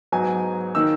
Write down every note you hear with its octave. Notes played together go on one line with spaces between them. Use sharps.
G#2 F#3 B3 D#4 G#5
D#3 A#3 D#4 E6